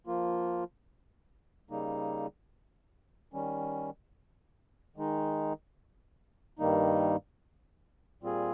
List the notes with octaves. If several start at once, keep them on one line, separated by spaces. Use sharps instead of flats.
F3 A#3 F4
C#3 G3 A#3 D#4
D#3 G3 C#4
D#3 G#3 D#4
G2 D#3 G3 A#3 D#4
A#2 G3 C4 F4 G#4